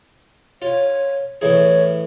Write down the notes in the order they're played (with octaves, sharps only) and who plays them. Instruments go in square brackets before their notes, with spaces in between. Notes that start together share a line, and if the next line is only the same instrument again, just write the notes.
[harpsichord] F4 [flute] C#5
[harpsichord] A2 E3 G#4 [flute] C#5